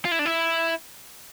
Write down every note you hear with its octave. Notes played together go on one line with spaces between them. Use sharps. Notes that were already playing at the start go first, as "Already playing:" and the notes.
F4
E4
D4
E4